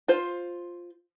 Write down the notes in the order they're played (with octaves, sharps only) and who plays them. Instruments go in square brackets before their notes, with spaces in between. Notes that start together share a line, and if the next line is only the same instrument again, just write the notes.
[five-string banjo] F4 C5